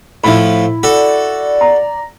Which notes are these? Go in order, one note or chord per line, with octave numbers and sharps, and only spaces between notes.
A2 F3 E4 B5
F#4 A4 D5
A#5